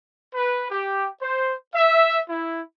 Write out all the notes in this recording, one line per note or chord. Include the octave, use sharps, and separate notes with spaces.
B4
G4
C5
E5
E4